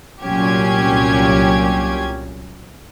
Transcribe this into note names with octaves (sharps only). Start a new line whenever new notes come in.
C2 A#2 F#3 C#4 G4 G#6